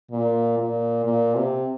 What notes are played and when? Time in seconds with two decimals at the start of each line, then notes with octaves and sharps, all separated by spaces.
0.11 A#2
0.58 A#2
1.05 A#2
1.36 C3